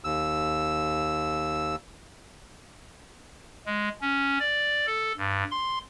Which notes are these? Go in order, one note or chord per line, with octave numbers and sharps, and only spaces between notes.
D#2 E6
G#3
C#4
D5
A4
G2
C6